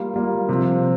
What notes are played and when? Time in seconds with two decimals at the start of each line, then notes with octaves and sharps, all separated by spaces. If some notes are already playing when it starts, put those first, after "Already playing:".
Already playing: G3 A#3 F4
0.14 G3 A#3 F4
0.49 C3 F3 C4